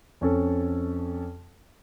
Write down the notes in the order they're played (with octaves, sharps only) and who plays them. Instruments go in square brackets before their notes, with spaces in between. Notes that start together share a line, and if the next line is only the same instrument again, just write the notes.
[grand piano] F2 C#4 A4